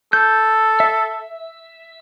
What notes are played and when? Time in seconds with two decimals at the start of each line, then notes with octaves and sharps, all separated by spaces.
0.13 A4 G6
0.80 E5